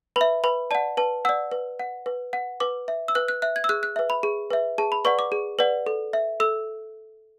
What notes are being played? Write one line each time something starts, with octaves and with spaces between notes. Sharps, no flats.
B4 E5 B5
B4 B5
D5 F#5 A5
B4 A5
D5 F#5 E6
B4
F#5
B4
F#5
B4 D6
E5
E6
B4 F#6
F#6
E5 F#6
G#6
E6
G#4 F#6
F#6
B4 E5
B5
G#4
B4 E5
G#4 A5
B5
B4 D5 F#5 C#6
D6
G#4
B4 D5 F#5
A4
E5
A4 E6